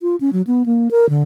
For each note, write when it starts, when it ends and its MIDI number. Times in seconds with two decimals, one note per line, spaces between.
0.01 0.16 65
0.20 0.30 61
0.33 0.42 54
0.47 0.65 59
0.66 0.91 58
0.91 1.09 70
1.09 1.23 50